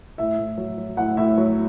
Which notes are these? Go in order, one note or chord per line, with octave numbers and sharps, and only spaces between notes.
A2 E5
A2
F#3
F#3
A2 F#5
A2 E5
F#3